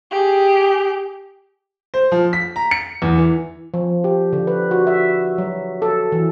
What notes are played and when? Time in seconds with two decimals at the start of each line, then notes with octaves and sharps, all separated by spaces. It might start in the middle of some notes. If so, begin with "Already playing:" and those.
0.11 G4 G#4
1.94 C5
2.12 F3
2.33 B6
2.56 A#5
2.71 C#7
3.02 E2
3.18 E3
3.74 F3
4.04 G4
4.33 D3
4.47 B4
4.71 F#4
4.87 E5
5.38 F#3
5.82 A4
6.12 E3